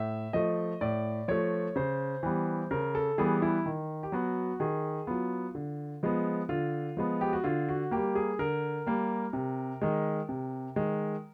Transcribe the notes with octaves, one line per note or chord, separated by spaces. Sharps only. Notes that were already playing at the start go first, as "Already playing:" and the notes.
Already playing: A2 E5
F3 A3 D#5
A2 D5
F3 A3 C#5
C#3 C5
E3 G3 B3
C#3 A#4
A4
E3 G3 B3 G#4
E4
D#3
G4
F#3 B3 F#4
D#3 G#4
F#3 B3 F4
D3
F3 G#3 B3
D3 F4
F3 G#3 B3
G4
F#4
D3 F4
F#4
G3 A#3 G4
G#4
D3 A#4
G3 A#3
C3
D#3 G#3
C3
D#3 G#3